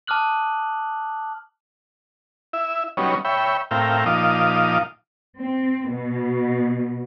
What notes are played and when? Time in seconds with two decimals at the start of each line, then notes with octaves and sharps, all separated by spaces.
0.07 A5 D6 D#6 F6 F#6 F#7
2.53 E4 E5
2.97 F#3 G3 B3 C#4 D#4 C#5
3.25 C#5 E5 G5 B5
3.71 A2 C4 E4 A#4 F5 G5
4.06 A#2 F3 D#4 F5 D6 D#6
5.40 C4
5.91 B2